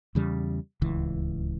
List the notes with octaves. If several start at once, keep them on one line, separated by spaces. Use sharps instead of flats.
E2 C#3 G3
D1 C#2 E3